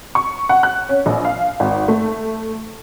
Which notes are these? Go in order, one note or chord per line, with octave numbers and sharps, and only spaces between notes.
C#6
F#5
F#6
C#4
A#1
F5
G#1
A3